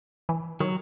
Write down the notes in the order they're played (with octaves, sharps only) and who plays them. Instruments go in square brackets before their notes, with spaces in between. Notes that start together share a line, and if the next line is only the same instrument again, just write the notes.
[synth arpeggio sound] E3
[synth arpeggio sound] D#3 C#5 [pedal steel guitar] F#3